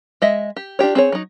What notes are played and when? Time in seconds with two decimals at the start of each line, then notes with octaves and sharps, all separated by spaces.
0.22 G#3 D#5 E5
0.56 G4
0.79 D4 F4 G4 C#5
0.95 C4 G#4 C#5
1.12 F#3 D#4